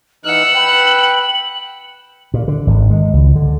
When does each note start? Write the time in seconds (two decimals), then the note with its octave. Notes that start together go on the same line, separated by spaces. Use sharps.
0.25 E3 D#4 F#5 E6 F6 F#7
0.55 B4 G5
2.34 A#2
2.48 D3
2.67 G#1
2.91 G#3
3.13 C#2
3.36 D3